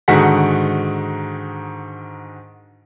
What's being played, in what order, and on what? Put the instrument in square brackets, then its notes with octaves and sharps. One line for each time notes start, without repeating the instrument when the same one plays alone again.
[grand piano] G#2 D3 D#3 F#4 F#5 B6